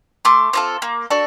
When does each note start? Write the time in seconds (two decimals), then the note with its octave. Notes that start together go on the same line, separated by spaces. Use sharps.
0.25 A3 C6 D6
0.53 C4 F4 A4
0.82 A#3
1.10 D4 F#4 A4